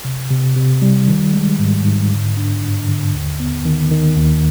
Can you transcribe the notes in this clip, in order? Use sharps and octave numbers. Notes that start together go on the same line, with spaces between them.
C3
C3
C3
G3
D#3
G#3
G#2
G#2
D3
D4
G2
D3
D#2
B3
D#3
D#3
D#2